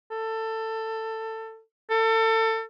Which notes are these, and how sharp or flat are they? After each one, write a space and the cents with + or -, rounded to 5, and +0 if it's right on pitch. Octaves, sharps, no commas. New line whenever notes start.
A4 +20
A4 +30